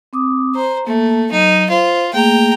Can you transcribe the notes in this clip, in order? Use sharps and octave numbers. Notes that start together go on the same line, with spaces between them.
C4 D6 D#6
C5 A#5
A3 A#3
F#3 D#4
F4 C5
A3 A#3 G#4 G5 A#5